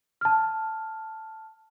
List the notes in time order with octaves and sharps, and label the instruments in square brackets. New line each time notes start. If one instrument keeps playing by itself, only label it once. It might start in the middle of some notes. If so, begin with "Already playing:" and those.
[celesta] A5 F6